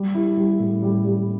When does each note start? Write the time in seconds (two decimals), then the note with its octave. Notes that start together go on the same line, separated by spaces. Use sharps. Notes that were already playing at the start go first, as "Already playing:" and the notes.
Already playing: G3
0.15 E4
0.37 G3
0.59 A2
0.82 G3
1.05 G3